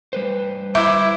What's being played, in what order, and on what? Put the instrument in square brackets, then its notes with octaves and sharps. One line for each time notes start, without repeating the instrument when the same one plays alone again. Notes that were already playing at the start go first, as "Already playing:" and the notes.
[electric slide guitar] G3 B4 C5
[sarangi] E4 [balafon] E5 [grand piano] D6 G6